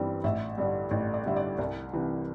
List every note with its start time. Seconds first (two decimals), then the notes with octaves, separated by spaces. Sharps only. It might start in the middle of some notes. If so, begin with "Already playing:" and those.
Already playing: G1 G2 E3 G3 C4
0.24 A1 E5
0.58 G2 D3 G3
0.91 A1
1.14 D5
1.26 G2 D3 G3 E5
1.36 D5
1.58 C2
1.93 C3 E3